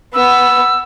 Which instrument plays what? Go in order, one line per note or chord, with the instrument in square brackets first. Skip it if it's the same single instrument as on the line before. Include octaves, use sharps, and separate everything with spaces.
[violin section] B3 [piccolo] E6